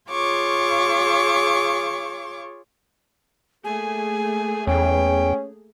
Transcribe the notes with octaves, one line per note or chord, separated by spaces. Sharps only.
F4 G#4 C#5 C#6 D6
A3 A#3 G#4 G#5
E2 C#4 G5